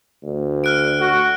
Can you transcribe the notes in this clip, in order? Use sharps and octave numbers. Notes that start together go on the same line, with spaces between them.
D2
F6 F#6 D7
F#4